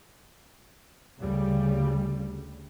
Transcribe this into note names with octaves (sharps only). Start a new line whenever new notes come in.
D2 C#3 G3